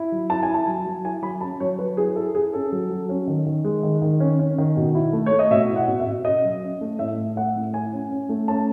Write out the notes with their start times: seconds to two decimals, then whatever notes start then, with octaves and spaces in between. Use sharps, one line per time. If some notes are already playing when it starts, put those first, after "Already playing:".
Already playing: E4
0.12 F#3
0.30 E4 A5
0.43 G#5
0.49 E4
0.54 A5
0.67 F#3
0.86 F#3
1.05 E4 G#5
1.22 F#3 B5
1.41 C#4 A5
1.60 F#3 C#5
1.79 F#3 B4
1.97 E4 G#4
2.16 E4 A4
2.34 E4 G#4
2.53 C#4 A4
2.72 F#3
2.90 F#3
3.09 C#4
3.27 D#3
3.46 D#3
3.64 G#3
3.83 D#3
4.02 D#3
4.20 C#4
4.39 C#4
4.58 D#3
4.77 B2
4.95 E4
5.13 A3
5.26 C#5
5.32 A3
5.39 D#5
5.51 B2 E5
5.69 E4
5.76 F#5
5.88 B2
6.00 E5
6.07 B2
6.25 C#4 D#5
6.44 F#3
6.63 C#4
6.81 A3
6.99 A2 E5
7.18 A2
7.36 A3 F#5
7.56 A2
7.74 E4 G#5
7.93 C#4
8.11 C#4
8.29 A3
8.48 C#4 A5